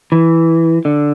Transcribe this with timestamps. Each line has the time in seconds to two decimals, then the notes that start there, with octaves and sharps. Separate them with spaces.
0.12 E3
0.85 D3